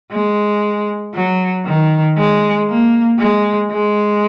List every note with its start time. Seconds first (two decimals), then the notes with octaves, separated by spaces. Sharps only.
0.11 G#3
1.14 F#3
1.66 D#3
2.17 G#3
2.68 A#3
3.19 G#3
3.71 G#3